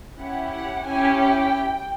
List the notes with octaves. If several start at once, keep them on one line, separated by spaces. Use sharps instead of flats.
C#4 E4 G4 F#5
F#5
C#4 E4 G4 G#5
G5